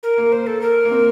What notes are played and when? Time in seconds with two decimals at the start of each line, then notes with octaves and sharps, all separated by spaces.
0.03 A#4
0.18 A#3
0.32 C5
0.47 A4
0.61 A#4
0.85 A#3
0.91 C4